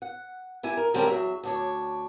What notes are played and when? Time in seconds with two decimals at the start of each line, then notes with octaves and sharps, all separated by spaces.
0.02 F#5
0.63 G3 E4 G#5
0.77 A#4
0.94 D3 G3 G#3 C4 C#4 A#4
1.07 E2 F#3 E5
1.43 D2 D4 C#5